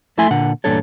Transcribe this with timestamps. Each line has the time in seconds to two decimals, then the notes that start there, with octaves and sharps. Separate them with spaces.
0.18 F2 A3 E4 E5 G#5 C6
0.30 A#2 D3 F#5
0.64 E2 G2 A#2 D4 A4 C#5